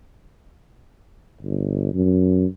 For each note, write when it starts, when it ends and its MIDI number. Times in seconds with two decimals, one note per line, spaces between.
1.41 1.92 31
1.94 2.46 42